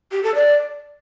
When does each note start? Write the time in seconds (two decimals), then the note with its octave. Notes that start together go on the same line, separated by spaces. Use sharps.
0.12 G4
0.23 A4
0.35 D5